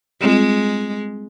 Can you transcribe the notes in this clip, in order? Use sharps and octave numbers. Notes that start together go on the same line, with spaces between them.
G3 G#3 C4 F4